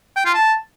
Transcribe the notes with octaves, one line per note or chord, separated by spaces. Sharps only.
G5
F4
A5